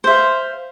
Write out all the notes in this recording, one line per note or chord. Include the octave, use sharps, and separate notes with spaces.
C5 E5 F5